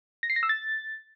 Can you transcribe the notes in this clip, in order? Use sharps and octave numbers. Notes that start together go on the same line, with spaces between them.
A#6
C7
A#6
E6
A6